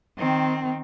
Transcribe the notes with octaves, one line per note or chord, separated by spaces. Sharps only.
D#3 C4